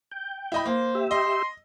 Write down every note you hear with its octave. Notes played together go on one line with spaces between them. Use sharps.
G5
E4 D#5 B5
A#3 C5
G4 E5
D#5 C6